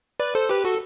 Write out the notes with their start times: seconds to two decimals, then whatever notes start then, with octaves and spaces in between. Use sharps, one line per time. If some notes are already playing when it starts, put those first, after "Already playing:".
0.20 B4 D5
0.35 A4 C5
0.49 G4 B4
0.65 F#4 A4